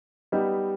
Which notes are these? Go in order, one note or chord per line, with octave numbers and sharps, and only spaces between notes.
G3 B3 D#4 G4